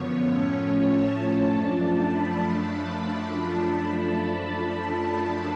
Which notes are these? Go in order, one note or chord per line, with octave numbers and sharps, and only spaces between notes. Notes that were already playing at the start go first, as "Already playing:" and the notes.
Already playing: F#2 D3 F3 B3 C#5
A2 F3 A3 C#4
A5
F#2 F3 A3 D4
B5